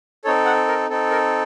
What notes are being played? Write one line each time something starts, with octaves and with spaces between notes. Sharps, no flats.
C4 D#4 A4 C#5
F#5
A#4
C4 D#4 A4
A#4